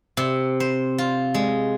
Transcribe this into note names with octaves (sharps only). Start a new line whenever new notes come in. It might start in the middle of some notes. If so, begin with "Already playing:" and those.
C3
C5
F4
G#3